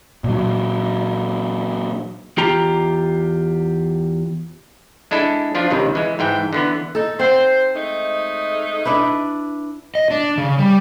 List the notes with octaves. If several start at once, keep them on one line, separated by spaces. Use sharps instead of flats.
A#2 F#3
E2 F4 G4 A#5
G#3 D4 E4 A4
F3 D4 F4
C#2 C3 D#3
E3 G#3
G#2 E3 G5
D3 E3 B3
D#4 A4
C4 C5 F#5
G#3 A3 D#4
D4 E4 B4
D#5
D4
C#3
G3